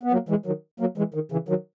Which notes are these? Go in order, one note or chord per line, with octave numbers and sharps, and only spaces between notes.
B3
F#3 A#3
E3 G#3
D#3 F#3
F#3 A#3
E3 G#3
D#3
C#3 E3
D#3 F#3